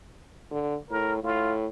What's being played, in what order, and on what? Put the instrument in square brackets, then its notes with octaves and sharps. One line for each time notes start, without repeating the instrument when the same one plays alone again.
[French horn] D3
[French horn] A2 [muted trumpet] A#4
[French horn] A2 [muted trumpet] F4